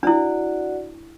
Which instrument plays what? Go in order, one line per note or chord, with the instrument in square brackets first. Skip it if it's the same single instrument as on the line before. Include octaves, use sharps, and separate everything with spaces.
[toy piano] D4 E4 [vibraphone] F#4 D5 F#5